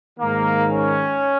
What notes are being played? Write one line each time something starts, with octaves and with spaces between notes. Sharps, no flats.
G#2 D#3 A#3
C#4